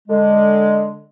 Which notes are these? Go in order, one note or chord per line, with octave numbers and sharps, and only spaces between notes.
D3 G#3